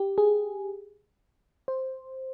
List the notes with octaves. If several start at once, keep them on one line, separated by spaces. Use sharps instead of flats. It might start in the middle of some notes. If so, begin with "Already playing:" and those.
Already playing: G4
G#4
C5